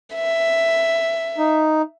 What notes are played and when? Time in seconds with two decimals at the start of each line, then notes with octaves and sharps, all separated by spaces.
0.15 E5
1.38 D#4